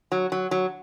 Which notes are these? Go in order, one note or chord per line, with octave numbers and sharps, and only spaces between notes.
F#3
F#3
F#3